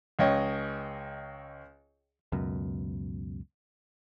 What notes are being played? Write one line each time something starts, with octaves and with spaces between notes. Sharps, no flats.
C#2 C#5 D#5 G5
C#2 F#2 B2